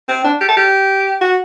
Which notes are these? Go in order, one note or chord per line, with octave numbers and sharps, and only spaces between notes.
C4
D4
G4
A4
G4
F#4